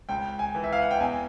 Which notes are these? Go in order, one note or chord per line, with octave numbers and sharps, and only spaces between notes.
C#2 G5
G#5
E3
E5
F5
F#5
G5
E2 G#5